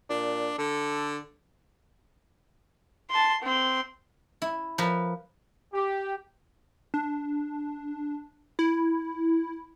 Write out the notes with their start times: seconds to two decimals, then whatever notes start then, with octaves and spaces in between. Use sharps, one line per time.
0.10 A#2 D4
0.58 D3 A4
3.11 A5 C6
3.42 C4 C6
4.42 E4
4.78 F3 A#4 B4
5.73 G4
6.94 D4
8.59 E4